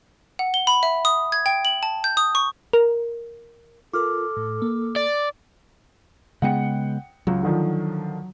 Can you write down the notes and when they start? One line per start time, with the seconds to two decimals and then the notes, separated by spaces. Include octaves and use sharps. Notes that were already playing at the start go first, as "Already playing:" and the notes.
0.39 F#5
0.54 G7
0.67 B5
0.83 E5
1.05 D#6
1.32 G#6
1.46 G5
1.65 F#7
1.83 A5
2.04 G6
2.17 D#6
2.35 C#6
2.73 A#4
3.93 F4 A4 A#4 D6 F6
4.37 A2
4.62 A#3
4.96 D5
6.42 C#3 G#3 B3 F#5 G5 C#7
7.27 C#2 F#3
7.43 D3 D#3 F3